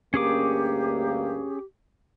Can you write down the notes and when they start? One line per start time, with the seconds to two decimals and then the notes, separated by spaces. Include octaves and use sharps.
0.14 D2 G2 A#3 C#4 G4 G#4 D6